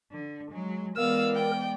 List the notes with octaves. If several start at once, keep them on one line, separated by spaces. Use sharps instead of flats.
D3
F#3 G#3
E3 G#3 B3 A#4 D5 F5 E6
G5